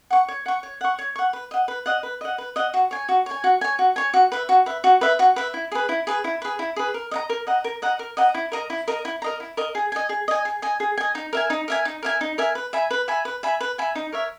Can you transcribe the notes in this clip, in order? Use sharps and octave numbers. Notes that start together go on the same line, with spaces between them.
F#5 C#6
C#5
F#5 C#6
C#5
F#5 C#6
C#5
F#5 C#6
B4
D#5 F#5
B4
D#5 F#5
B4
D#5 F#5
B4
D#5 F#5
F#4
C#5 G#5
F#4
C#5 G#5
F#4
C#5 G#5
F#4
C#5 G#5
F#4
B4 E5
F#4
B4 E5
F#4
B4 E5
F#4
B4 E5
E4
G#4 B4
E4
G#4 B4
E4
G#4 B4
E4
G#4 B4
A#4
D#5 F#5 A#5
A#4
D#5 F#5 A#5
A#4
D#5 F#5 A#5
A#4
D#5 F#5 A#5
E4
A#4 D#5 A#5
E4
A#4 D#5 A#5
E4
A#4 D#5 A#5
E4
A#4 D#5 A#5
G#4
D#5 G#5
G#4
D#5 G#5
G#4
D#5 G#5
G#4
D#5 G#5
D#4
A#4 E5 G#5
D#4
A#4 E5 G#5
D#4
A#4 E5 G#5
D#4
A#4 E5 G#5
B4
E5 G#5 B5
B4
E5 G#5 B5
B4
E5 G#5 B5
B4
E5 G#5 B5
D#4
A#4 C#5 E5